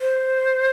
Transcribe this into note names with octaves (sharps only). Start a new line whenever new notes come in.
C5